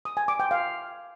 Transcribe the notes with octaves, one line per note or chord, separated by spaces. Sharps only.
D#6
G#5
D6
G5
F5